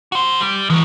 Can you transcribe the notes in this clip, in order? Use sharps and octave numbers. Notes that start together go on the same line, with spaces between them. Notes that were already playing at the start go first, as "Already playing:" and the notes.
F#4 C5
G3
E3 F#3 G#3